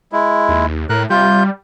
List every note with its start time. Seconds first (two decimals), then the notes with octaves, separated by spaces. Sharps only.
0.12 G#3 E4
0.49 D#2
0.90 A2 A#4 F#6
1.10 C3 G3 F4 G6